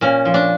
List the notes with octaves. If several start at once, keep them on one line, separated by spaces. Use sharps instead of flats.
A#2 C#4
F3
D4